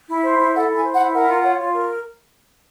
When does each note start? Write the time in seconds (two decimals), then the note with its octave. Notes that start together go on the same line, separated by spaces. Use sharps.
0.09 E4
0.24 C5
0.38 E4
0.54 A4 F#5
0.69 E4
0.74 G#5
0.83 C5
0.94 F#5
0.99 E4
1.14 A#4 F#5
1.29 F4
1.43 C#5
1.60 F4
1.74 A#4